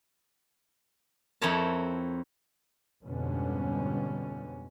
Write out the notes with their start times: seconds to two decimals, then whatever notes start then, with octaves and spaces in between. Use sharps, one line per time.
1.42 F2 C4 E4 A#4 C#5 A5
3.04 F2 G#2 B2 D3 G3 C#4